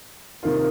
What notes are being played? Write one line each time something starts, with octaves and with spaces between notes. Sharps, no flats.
C3 D#3 A#3 F4